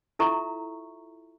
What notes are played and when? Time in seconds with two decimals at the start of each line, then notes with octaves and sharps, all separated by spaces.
0.19 E4 F4 A4 E5 A#5 C#6